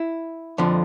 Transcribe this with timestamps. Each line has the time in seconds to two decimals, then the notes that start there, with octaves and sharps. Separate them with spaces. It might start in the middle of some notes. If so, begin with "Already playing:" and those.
Already playing: E4
0.58 F2 D3 F3